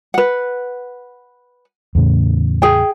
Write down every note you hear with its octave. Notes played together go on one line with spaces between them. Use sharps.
B4 F#5
E2 A2 C#3
G#4 G5